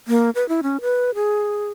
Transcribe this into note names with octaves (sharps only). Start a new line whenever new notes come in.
A#3
B4
E4
C#4
B4
G#4